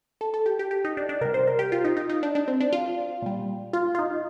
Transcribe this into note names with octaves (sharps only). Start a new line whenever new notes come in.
A4
A4
G4
G4
G4
D#4
D4
D4
C3 G3 A#4
C5
A#4
G4
F4
D#4
D#4
D#4
D4
D4
C4
D4
F4
A#2 G3
F4
F4
D#4